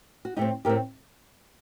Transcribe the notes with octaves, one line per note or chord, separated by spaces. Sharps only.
F#4
A2 A3 C4 D#4 G4
A2 A3 C4 G4 A#4